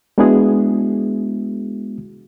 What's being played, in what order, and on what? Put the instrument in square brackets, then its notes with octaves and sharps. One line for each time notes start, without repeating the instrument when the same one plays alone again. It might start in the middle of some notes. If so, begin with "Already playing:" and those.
[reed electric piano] G#3 B3 D4 E4 F#4 G#4